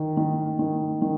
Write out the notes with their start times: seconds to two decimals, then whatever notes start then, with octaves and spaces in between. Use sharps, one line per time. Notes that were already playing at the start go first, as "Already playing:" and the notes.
Already playing: D#3
0.17 D#3
0.59 D#3
1.02 D#3